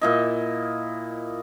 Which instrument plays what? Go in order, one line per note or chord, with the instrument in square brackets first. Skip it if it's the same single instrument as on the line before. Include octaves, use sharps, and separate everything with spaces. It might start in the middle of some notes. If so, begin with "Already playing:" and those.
[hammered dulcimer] A#2 E4 D#5